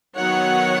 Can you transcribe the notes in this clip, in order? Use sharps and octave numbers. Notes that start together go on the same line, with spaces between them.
D#3 F#3 B3 C#5 F#5